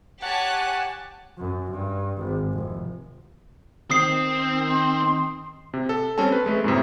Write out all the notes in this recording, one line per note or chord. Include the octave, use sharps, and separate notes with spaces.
G4 C#5 F#5 G#5 A5 F#6
F#2
G2
G#1
F1
D#3 C4 D#6 C7
C6
C3
A4
G3 C4 C#4 A4 A5
B4
G#3 A3 B4
F#2 A2 C3